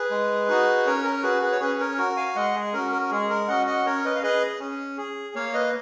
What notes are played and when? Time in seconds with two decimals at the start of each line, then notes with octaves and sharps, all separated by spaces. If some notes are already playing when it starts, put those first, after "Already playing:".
Already playing: G#4 B4
0.11 G#3
0.49 D#4 F#4
0.86 C#4 A#4 C#5
1.04 A#4
1.23 F#4 G#4 B4
1.42 G#4 B4
1.52 C#5
1.60 C#4 G#4 B4
1.80 A#4 C#5
1.98 F#4 A#4
2.17 F5 G#5
2.35 G#3 D#5 F#5
2.55 G#4
2.73 C#4 F#4 A#4
2.92 A#4
3.02 A#4
3.11 G#3 G#4
3.30 A#4
3.48 C#4 F#4 D#5 F#5
3.66 D#5 F#5
3.86 C#4 A#4 C#5
4.05 B4 D#5
4.16 F5
4.23 G#4 B4 D#5
4.60 C#4
4.97 G#4
5.35 A#3 C#5 F5
5.54 B4 D#5